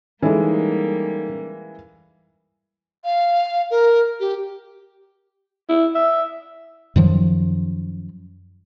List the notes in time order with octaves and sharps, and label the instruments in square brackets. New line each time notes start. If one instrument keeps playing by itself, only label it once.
[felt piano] E3 G#3 [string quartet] G3 A#3 [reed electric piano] C#4 D#4 A4
[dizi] F5
A#4
G4
[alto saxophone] E4
E5
[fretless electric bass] F#2 D#3 F3 F#3